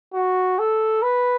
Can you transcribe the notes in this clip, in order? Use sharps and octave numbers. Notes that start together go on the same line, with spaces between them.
F#4
A4
B4